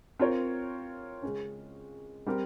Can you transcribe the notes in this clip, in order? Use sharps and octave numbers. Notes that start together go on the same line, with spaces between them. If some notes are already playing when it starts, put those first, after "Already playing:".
C4 F4 A#4 C#5
C#3 G#3 C#4
G3 C4 G4 A#4